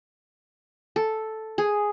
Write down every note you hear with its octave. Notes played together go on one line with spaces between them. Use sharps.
A4
G#4